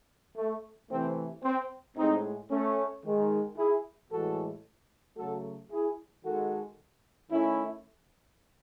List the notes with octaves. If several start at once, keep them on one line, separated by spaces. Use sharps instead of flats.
A3
C3 E3 A3 C4
C4
A2 G#3 C4 D#4
A3 C#4
D#3 G#3
E4 G#4
A2 E3 G#3 F#4 A4
C#3 F#3 A3 F#4 A4
E4 G#4
D#3 G#3 F#4 A4
D#3 A3 C#4 E4